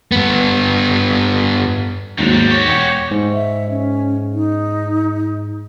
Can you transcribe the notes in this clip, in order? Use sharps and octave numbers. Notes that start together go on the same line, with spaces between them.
G2 B3
D#2 G#2 D#3 F#3 D4
C2 G3
F#4 G4 C#5
E1 C#5 G5 G#6
G#2
E5
C#4
D#4